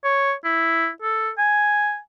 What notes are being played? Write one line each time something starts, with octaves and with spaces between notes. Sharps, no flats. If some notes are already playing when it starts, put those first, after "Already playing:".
C#5
E4
A4
G#5